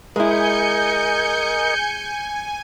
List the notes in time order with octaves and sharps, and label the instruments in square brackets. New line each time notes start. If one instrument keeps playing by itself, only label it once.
[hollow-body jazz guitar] G#3 E4 [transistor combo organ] A#4 D#5 [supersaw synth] G#5 [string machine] G6 C#7